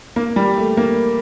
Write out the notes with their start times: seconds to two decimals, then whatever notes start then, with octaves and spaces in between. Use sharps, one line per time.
0.16 A#3
0.36 G3
0.57 A3
0.77 A#3